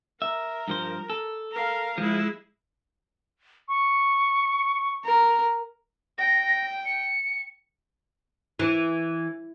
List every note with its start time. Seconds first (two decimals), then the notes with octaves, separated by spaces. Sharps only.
0.22 A#4 E5
0.68 G2 F3 C5
1.10 A4
1.52 A#4 F5
1.98 F3 G#3 E4
3.68 C#6
5.05 A#4
6.18 G5 A#6
6.85 C#7
8.59 E3